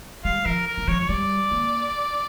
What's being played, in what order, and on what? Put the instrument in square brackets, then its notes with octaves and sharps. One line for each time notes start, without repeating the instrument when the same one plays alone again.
[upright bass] G3 [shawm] F5
[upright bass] F3 [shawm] A#4
[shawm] A#4
[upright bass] E3
[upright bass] F3 [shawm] C#5
[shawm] C#5
[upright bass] G3 [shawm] D5
[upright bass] A#3